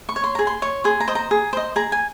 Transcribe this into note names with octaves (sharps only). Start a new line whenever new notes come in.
C#6
C#5
C6
G#4 A#5
C6
C#5
G#4 C6
A#5
C5 D#5
A#5
G#4
C5 D#5
G#4 A#5
G#5